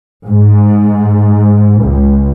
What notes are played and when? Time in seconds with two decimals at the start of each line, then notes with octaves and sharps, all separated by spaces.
0.27 G#2
1.82 C#2